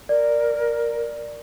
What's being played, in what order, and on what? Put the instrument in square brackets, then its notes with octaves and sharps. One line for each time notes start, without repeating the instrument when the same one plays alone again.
[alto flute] A#4 [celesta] D5